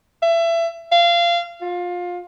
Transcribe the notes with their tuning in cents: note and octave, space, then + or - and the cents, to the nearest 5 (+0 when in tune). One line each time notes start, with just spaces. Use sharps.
E5 +25
F5 -25
F4 +20